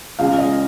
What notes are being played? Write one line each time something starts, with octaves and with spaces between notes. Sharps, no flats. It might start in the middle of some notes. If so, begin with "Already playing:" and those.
C#2 C#3 G#3 F5
D#5